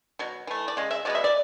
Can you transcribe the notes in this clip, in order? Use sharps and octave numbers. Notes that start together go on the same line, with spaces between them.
B2 F#3
E3 A3
D5
C#3 G#3
E5
B2 G#3 B3 D5
E5
D5